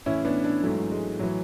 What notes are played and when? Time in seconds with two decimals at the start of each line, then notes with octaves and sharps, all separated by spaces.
0.06 A2 E3 C#4 E4
0.25 B3 D4
0.44 B3 D4
0.63 G#2 E3 F#3 A3
0.91 G#3
1.19 A2 E3 F#3